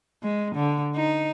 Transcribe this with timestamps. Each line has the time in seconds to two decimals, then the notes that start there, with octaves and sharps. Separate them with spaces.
0.23 G#3
0.55 D3
0.96 D#4